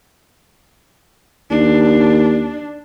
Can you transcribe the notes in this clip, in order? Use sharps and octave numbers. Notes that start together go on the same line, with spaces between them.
D#2 D4